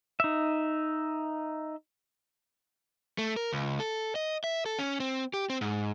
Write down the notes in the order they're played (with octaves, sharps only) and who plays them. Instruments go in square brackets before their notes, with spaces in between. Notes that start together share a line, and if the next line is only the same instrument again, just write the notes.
[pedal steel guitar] D#4 E5
[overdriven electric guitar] A3
A#4
C#2
A4
D#5
E5
A4
C#4
C4
G4
C4
G#2